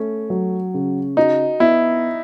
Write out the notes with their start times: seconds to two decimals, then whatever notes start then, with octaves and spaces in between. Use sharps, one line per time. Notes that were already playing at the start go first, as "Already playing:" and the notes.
Already playing: A3 C#4
0.30 F#3
0.74 C#3
1.17 D#4 F#4
1.60 B3 E4